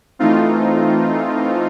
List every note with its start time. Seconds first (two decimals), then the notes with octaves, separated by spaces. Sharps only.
0.19 E3 A3 C4 D#4 F4